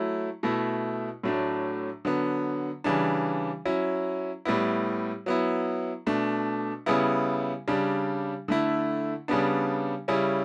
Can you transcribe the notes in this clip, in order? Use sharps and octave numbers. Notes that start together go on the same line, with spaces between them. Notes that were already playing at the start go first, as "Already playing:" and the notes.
Already playing: F#3 A3 E4
B2 A3 E4
A2 F#3 A3 D4
D3 F#3 B3
C#3 E3 G3 D4
F#3 C#4 E4
A2 G3 B3 E4
F#3 B3 E4
B2 A3 D4
C#3 G3 B3 E4
C#3 G3 D4
D3 A3 E4
C#3 G3 B3 D4
C#3 G3 C#4 E4